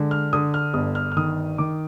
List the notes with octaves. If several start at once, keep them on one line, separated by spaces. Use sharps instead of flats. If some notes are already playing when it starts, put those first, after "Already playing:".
Already playing: D3 G#3
F6
D3 D#6
F6
G1 D#6
F6
F6
D#3 D#6
D#3 D6